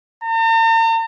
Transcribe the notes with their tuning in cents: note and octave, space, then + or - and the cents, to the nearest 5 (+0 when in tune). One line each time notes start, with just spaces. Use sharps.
A#5 -45